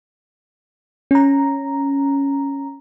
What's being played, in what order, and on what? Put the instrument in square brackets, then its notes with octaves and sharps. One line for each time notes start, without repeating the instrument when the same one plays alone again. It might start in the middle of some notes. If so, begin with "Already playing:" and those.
[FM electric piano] C#4 A#5